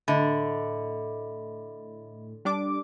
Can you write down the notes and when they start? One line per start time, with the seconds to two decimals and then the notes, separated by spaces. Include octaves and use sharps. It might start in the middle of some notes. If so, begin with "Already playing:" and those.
0.08 A2 D3 D#5 E5 B5
2.45 G3 D4 D6